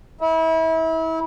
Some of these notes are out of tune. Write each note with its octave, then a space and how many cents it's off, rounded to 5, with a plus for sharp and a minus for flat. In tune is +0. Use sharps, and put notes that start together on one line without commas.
E4 -30